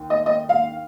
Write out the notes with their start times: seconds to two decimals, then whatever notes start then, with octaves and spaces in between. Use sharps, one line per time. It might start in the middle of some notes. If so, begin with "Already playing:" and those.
Already playing: D#2
0.10 D#5
0.26 D#5
0.49 F5